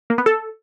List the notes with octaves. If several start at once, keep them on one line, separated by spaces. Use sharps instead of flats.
A#3
B3
A4